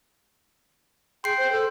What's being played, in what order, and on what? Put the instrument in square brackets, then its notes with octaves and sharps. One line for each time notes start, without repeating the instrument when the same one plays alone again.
[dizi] G#4 [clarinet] G5 [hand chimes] C6 C7
[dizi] C5
A4